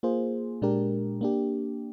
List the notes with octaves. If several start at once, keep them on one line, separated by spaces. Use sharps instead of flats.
A#3 F4 G#4 C5
A#2 G#3 D4 G4 A#4
A#3 D4 G4